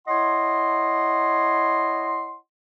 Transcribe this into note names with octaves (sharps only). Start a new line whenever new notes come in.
E4 C#5 D#5 F#5 C6